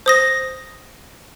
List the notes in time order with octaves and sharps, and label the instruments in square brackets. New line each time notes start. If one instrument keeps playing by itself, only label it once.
[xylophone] C5 D#6 A#6